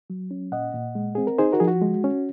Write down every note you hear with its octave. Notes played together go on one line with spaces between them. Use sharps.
F#3
C#4
A#2 D#5 F#5
A#2
G#3
C4 G#4
A#4
D#4 G#4 C5
F#4 A#4
F3 G#4
F#4
G#3
C#4